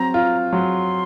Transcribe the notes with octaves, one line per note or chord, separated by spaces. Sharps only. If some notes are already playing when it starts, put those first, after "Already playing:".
Already playing: F#3 C4 A#5
F4
F#3 C6